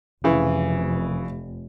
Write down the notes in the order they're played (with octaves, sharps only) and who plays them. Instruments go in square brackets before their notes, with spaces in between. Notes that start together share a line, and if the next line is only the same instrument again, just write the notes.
[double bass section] F1 [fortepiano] C#3 E3